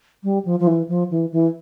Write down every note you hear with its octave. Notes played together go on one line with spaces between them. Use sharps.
G3
F3
F3
E3
F3
E3
E3